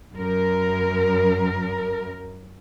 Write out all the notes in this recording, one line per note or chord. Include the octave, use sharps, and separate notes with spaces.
F#2 A#4